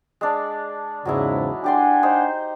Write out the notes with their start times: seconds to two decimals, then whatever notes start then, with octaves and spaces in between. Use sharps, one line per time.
0.21 G#3 D4
1.05 E2 G#2 C#3 F#3 G#3 E4
1.64 D4 G4 D5 F#5 G#5 C6
2.03 D#4 C5